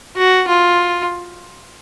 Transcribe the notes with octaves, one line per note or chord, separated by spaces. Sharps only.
F#4
F4